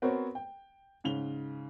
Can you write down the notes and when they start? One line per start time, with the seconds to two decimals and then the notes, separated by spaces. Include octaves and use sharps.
0.02 B3 C4 F#4 A#4 C5 C#5
0.35 G5
1.04 G#2 C#3 F7 G7